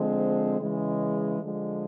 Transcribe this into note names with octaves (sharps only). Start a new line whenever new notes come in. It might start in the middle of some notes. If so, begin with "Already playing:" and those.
Already playing: D3 F3 G#3 C4
C#3 E3 G#3
D3 F3 G#3